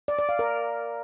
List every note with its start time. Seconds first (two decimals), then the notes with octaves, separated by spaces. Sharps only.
0.08 D5
0.19 D5
0.29 F5
0.39 A#4